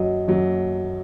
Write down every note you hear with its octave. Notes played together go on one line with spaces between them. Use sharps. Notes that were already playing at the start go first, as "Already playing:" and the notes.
Already playing: F#2 F#3 D#5
F#2 F#3